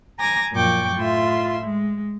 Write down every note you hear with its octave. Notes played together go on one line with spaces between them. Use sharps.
G#5 A#5 D6 G#6 A#6
F#2 A#2 F3 G5 C#6 D6
A2 F4 E5 C6
G#3